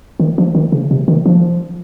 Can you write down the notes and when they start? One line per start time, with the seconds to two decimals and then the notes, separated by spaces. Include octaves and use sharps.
0.20 D#3
0.38 F3
0.55 D#3
0.72 C#3
0.91 C3
1.08 D#3
1.26 F3